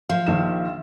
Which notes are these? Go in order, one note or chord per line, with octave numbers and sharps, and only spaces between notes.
F3 E5 F5
A#1 D#3 E7